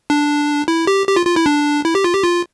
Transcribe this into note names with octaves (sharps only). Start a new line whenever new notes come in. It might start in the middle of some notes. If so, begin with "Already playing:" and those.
D4
E4
G4
G4
F4
F4
E4
D4
E4
G4
F4
G4
F4